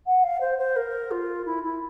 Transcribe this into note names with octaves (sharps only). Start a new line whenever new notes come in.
F#5
F5
C5
C5
A#4
F4
E4
E4